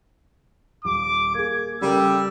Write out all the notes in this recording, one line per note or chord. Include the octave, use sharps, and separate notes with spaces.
D#1 D6
A#3 G#4 G#6
C#3 G3 A4 A#4 E6